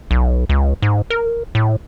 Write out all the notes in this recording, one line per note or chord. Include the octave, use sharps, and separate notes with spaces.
B1
C#2
G#2
A#4
A2